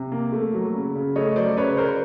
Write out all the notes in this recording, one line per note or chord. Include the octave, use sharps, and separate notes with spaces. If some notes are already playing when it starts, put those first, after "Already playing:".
Already playing: C3
A#3
A3
F#3
C#3
C#3
A3 C#5 D#5
F#3 C5 D5
C#3 B4 C#5
C#3 A#4 C5